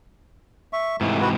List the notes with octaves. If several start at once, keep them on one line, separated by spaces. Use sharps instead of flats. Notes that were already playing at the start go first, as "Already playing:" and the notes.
E5 C#6
G#2 C3 E3 A3 E4
F#4 B4